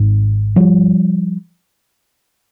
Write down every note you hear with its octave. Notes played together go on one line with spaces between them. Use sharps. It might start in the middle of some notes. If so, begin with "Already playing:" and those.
Already playing: G#1 G#2
F3 G3